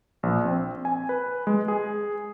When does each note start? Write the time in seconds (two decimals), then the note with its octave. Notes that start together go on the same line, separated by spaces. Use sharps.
0.23 A#1
0.45 C4
0.85 G#5
1.09 B4
1.47 G#3
1.68 G#4